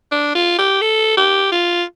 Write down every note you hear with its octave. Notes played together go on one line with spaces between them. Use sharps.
D4
F4
G4
A4
G4
F4